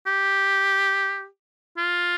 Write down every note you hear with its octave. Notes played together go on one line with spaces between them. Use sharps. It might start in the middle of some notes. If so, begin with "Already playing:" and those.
G4
F4